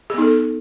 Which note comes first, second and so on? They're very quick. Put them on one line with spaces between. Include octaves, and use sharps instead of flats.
G#4 B3 D#4 A4